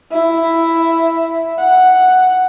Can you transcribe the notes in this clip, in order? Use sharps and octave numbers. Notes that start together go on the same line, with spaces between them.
E4
F#5